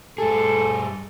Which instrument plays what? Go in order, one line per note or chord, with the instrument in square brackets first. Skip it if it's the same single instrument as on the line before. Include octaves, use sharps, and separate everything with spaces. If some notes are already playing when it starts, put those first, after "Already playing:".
[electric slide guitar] G2 G#4 [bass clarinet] A4